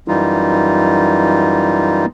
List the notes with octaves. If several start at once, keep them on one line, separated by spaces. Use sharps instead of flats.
F#2 E3 G3 D#4 F4